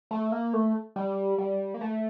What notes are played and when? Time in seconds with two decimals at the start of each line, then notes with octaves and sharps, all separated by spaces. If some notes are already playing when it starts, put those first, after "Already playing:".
0.11 A3
0.32 A#3
0.53 A3
0.96 G3
1.38 G3
1.74 A#3
1.81 A3